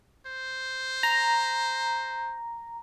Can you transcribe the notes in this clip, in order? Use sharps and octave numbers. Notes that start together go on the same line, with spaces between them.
C5
A#5